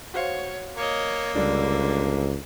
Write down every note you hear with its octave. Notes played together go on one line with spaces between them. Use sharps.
F#4 C5 C#5 F5
A#3 C#5 D#5
C#2 D3 G3 D4